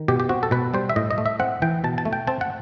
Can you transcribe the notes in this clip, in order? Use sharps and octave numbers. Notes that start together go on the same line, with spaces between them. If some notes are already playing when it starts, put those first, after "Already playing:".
Already playing: D#3
B2 G4
G4
C4 F#4
A4
B2 B4
G3 C5
E5
A2 D#5
D#5
A3
E5
C4 F#5
E3 G5
B2 A5
A5
A3
G5
C4 A5
F#5